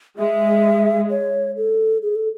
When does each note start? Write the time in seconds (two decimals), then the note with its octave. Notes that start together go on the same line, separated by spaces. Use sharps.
0.19 G#3 E5
1.10 C#5
1.57 A4
2.03 G#4
2.16 A4